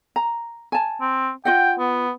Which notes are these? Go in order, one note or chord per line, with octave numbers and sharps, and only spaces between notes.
A#5
G#5 A5
C4
F4 D#5 F#5 G5
B3